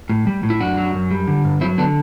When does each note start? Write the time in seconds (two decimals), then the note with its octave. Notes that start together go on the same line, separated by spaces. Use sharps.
0.10 A2
0.27 G3
0.43 A2
0.50 E4
0.60 F#2 D4 F#4
0.77 F#3
0.94 F#2
1.11 G3
1.27 D3
1.45 G2
1.61 F#3 C4 E4
1.78 D3 B3 D4